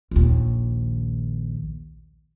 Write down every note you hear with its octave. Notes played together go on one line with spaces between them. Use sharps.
A#1 D#2